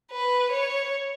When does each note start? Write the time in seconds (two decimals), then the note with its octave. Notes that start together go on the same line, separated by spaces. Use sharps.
0.12 B4
0.52 C#5